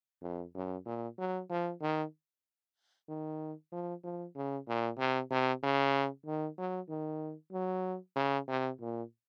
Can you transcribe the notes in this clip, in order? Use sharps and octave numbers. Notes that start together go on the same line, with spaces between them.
F2
F#2
A#2
F#3
F3
D#3
D#3
F3
F3
C#3
A#2
C3
C3
C#3
D#3
F#3
D#3
F#3
C#3
C3
A#2